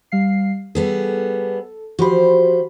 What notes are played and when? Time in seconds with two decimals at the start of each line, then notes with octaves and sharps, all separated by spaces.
0.12 G3 F5 C7
0.75 G3 B3 G#4 A4
1.99 F3 F#4 G4 C5 B5